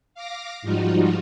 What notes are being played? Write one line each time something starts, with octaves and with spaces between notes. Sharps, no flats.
F5 D6 A#6
G#2 F3 G3 D#4 F4 F#4